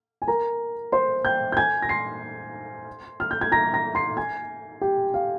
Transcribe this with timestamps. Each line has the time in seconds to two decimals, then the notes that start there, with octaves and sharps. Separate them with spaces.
0.22 G#5
0.28 A#4 A#5
0.92 C5 C6
1.25 G5 G6
1.52 G6
1.57 G#5 G#6
1.82 A#6
1.89 C6 C7
3.20 F6
3.31 G6
3.41 G#6
3.52 A#5 A#6
3.73 A#5 A#6
3.95 C6 C7
4.17 G#5 G#6
4.81 G4 G5
5.14 F5